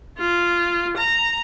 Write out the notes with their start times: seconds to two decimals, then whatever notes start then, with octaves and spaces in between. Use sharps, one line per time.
0.19 F4
0.97 A#5